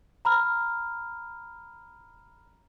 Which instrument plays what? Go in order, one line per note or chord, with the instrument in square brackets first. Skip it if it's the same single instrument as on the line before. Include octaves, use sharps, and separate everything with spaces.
[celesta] A#5 B5 F6